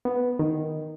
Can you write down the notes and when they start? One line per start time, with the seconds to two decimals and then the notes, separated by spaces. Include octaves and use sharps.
0.05 B3
0.39 D#3